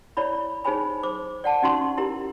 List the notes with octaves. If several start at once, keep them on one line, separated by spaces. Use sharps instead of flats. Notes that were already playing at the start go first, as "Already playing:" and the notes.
E4 C#5 D5 B5
D#4 G#4 C5 C#5 G#5 B5
C5 D6
D5 F#5 A5
C#4 D#4 F#4 A5 C6 C#6
E4 G4 A#4 A#5